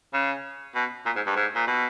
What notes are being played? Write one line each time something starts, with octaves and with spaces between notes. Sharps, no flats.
C#3
B2
A#2
G#2
G2
G#2
A#2
B2